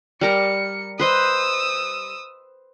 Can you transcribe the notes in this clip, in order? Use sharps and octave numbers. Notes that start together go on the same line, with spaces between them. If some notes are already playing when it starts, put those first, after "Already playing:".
G3 A#4 A#5 C#7
B4 C5 D#5 D#6 E6